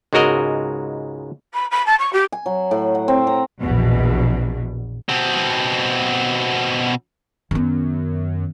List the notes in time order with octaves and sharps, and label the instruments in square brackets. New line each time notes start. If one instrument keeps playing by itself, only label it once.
[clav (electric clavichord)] C#2 G#2 G#3 F#4 A#4 D#5
[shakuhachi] B5
B5
A5
C#6
G4
[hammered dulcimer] G#5
F#3
A2
F#5
C4
A#5
[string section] A#1 E2 B2
[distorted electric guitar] B2 C4
[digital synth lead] F#2 [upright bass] D#3 B3